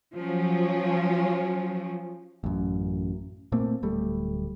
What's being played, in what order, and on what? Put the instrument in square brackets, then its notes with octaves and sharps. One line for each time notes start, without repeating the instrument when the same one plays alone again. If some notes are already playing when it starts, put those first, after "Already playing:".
[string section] F3 F#3 C#4
[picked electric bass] A1 F#2
A#2 A3 A#3 C4
D1 G3 A3